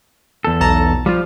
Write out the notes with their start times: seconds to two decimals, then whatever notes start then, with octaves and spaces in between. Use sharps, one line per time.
0.45 E2 A4
0.61 B1 A5 A#5
1.06 F3 G3 F4